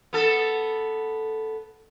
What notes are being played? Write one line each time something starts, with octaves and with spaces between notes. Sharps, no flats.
B3 A4